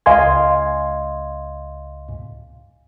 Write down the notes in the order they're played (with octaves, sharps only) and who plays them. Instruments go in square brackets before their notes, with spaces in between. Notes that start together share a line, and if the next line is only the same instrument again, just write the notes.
[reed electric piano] C#2 D#5 F5 G#5 C6 G#6